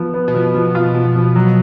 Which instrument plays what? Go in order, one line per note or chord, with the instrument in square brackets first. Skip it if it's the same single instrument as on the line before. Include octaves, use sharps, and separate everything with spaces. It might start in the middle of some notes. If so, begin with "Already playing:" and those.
Already playing: [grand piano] F3 B3
B3
[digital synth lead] B2
[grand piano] F3
F3
F4
F3
F3
F#3